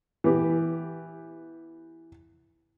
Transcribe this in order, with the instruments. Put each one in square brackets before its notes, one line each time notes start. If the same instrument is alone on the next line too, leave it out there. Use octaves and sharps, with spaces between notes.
[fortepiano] E3 B3 G4